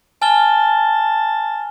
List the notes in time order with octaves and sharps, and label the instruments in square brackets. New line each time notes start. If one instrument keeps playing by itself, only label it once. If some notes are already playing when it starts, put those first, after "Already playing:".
[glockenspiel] G#5 F6 G7 [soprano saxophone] A5